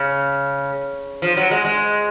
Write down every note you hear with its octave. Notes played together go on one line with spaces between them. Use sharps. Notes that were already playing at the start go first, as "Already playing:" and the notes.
Already playing: C#3
F3
F#3
G#3
G#3